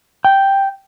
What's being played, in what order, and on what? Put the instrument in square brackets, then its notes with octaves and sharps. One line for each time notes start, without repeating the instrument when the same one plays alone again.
[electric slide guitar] G5